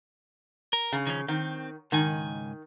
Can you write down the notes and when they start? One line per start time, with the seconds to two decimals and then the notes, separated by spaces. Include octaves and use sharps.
0.73 A#4
0.93 C#3
1.07 D#3 F3 C#4
1.28 D#3 C4
1.92 C#2 G#2 D#3 G#5